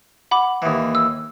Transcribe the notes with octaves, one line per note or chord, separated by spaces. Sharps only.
F#5 B5 D6
D#2 E3
E6